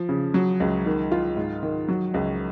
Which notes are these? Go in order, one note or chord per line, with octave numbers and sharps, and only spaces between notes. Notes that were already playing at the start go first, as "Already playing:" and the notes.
Already playing: F3
C#3
F#3
C#2
D#3
F4
G#2
D#3
F#3
C#2